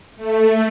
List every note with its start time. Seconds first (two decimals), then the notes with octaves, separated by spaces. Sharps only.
0.16 A3